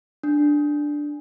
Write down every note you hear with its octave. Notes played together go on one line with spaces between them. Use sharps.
D4